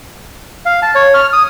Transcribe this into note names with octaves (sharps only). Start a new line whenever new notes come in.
F5
A5
C#5
F6
D#6